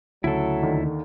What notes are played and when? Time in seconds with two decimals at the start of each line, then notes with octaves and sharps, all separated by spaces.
0.24 D2 C#3 F#3 E4 A4
0.63 D#2 D3 D#3